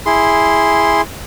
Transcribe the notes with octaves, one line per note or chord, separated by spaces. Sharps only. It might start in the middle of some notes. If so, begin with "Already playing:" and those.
E4 G#4 C6